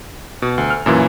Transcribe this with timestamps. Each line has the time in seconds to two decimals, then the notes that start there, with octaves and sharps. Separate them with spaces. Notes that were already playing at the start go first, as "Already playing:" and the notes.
0.42 B2
0.58 D2
0.70 F6
0.86 F#2 A#2 E3